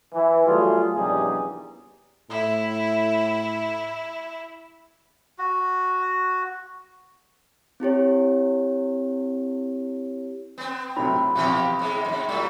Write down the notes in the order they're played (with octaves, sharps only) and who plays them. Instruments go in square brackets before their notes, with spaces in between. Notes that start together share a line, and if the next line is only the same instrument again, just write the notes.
[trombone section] E3
F#3 G3 A3 F4 G#4
A#1 E2 C#3 G3 D#4 G#4
[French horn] A2 [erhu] E4
[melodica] F#4
[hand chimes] C4 E4 G4 C#5
[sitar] B3 C4
[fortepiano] A2 C3 F#3 [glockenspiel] B5
[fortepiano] E2 C3 [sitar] E3 F3 G4
[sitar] G#2 G#3
F2 G#2
A2 F#3 G3